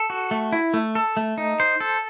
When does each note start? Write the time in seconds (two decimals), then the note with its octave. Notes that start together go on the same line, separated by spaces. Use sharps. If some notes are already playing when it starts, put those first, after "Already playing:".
Already playing: A4
0.10 F#4
0.31 A3
0.52 E4
0.74 A3
0.95 A4
1.17 A3
1.38 D#4
1.60 C5
1.80 A4